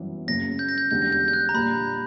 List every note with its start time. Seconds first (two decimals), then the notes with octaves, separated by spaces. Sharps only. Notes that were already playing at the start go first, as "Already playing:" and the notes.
Already playing: G1 F#2 E3 B3
0.27 F#1 F#2 C#3 A#6
0.59 G6
0.69 A#6
0.78 G6
0.91 E1 E2 D3 G3 G6
1.02 A#6
1.12 G6
1.28 G6
1.33 F#6
1.49 A#5
1.54 A#1 A#2 G3 B5